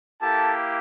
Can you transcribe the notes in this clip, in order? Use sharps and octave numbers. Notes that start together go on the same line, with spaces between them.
A#3 E4 G4 A4 A5